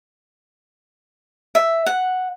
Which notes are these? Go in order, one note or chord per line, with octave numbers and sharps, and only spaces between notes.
E5
F#5